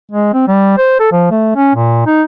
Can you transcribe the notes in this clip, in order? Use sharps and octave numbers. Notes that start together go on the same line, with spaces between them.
G#3
C4
G3
C5
A4
F3
A3
C#4
A#2
D#4